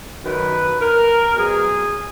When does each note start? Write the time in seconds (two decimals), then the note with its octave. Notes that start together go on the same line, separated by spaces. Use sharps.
0.24 F#2 D#3 F#3 B4
0.80 A#4
1.35 B2 F#3 G#4